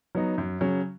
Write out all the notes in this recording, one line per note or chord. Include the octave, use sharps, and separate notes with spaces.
F#3 B3 D#4
F#2
C#3 F#3 C#4